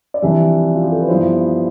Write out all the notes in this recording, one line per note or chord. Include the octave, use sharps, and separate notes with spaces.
D5
F2 C3 E3 G3 D4 E5
F4
G4
A4
B4
G2 F3 B3 E4 C5